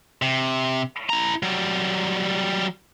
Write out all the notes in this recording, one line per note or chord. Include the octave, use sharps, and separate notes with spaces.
C3
E4 A#5
F#3 G3